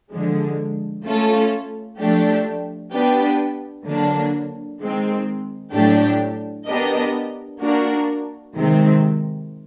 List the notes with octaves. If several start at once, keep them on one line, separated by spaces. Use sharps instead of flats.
D3 F3 G#3
A3 C#4 F4 A4
F3 A3 D4 G4
B3 D4 G4 B4
D3 F#3 A#3 D4
D#3 G#3 C4
A2 F#3 A3 D4 G4
B3 D4 G4 A#4 D#5
A#3 D4 F#4 A#4
C3 D#3 G#3 C4